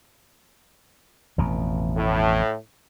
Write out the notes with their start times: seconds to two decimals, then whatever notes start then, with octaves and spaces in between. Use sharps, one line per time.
1.38 A1 F2 B2
1.96 A2